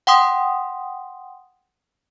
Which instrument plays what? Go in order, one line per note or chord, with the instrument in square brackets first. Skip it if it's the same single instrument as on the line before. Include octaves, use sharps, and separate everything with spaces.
[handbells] F#5 G5 C6 D#6